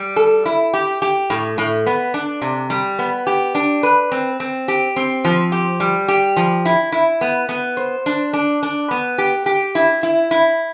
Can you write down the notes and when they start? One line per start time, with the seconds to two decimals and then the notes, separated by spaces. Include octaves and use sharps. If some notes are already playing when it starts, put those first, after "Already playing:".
Already playing: G3
0.16 A4
0.45 E4
0.74 G4
1.02 G4
1.30 A2
1.58 A2
1.86 B3
2.14 D4
2.42 C3
2.70 G3
2.99 B3
3.27 G4
3.55 D4
3.83 B4
4.12 C4
4.40 C4
4.68 G4
4.96 C4
5.25 F3
5.52 G4
5.80 G3
6.08 G4
6.36 F3
6.65 E4
6.92 E4
7.21 B3
7.49 B3
7.77 C5
8.06 D4
8.33 D4
8.63 D4
8.91 B3
9.18 G4
9.46 G4
9.75 E4
10.03 E4
10.31 E4